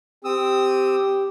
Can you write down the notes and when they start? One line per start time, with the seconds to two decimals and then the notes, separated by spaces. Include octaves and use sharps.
0.25 C4 G4 D#6 E6